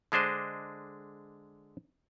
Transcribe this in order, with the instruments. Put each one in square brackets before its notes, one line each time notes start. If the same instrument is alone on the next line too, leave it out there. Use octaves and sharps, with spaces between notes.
[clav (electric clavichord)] D3 G#3 D4 C5 D#5